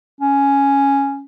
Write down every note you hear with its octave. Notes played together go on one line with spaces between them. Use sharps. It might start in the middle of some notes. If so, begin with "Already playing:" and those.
C#4